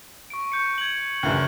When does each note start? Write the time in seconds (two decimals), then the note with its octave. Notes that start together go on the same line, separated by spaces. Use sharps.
0.30 C#6 D7
0.52 C#6 G6 C#7
0.78 G#6 F#7
1.23 C#2 F#2 D3 F#6